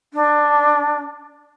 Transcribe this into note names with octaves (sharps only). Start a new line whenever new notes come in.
D4